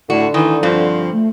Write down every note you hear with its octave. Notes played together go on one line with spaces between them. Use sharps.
A2 D3 F#4
D#3 E3
G2 F3 C4
A3